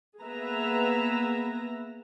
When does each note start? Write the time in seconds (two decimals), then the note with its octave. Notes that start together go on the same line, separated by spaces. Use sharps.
0.23 A#3 B3 G#4 B4 E5 A#5